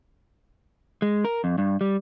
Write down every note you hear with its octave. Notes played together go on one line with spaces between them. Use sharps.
G#3
A#4
F2
G2
G3